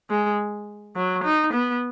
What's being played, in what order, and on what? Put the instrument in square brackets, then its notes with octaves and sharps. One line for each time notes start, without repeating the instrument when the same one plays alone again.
[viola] G#3
F#3
D#4
B3